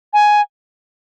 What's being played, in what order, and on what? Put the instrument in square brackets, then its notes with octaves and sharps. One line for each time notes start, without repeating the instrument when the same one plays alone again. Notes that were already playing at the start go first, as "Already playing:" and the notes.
[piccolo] G#5